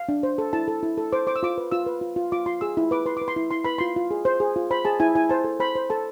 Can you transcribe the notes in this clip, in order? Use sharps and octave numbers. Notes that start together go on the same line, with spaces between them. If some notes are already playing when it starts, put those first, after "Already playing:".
Already playing: F5
D4
C5
A4
E4 A5
A4
E4
A4
C5 D6
C5 D6
E6
F4 D6
B4
F4 E6
B4
F4
F4
F4 D6
F4 C6
G#4 E6
E4
B4 D6
B4 C6
B4 D6
C6
E4
E4 C6
B4 B5
F4 C6
F4
G#4
C5
G#4
F4
C5 B5
G#4 A5
E4 G#5
E4 G#5
C5 A5
A4
C5 B5
C5
A4 A5